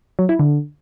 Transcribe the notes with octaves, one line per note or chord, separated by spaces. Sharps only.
F#3
E4
D3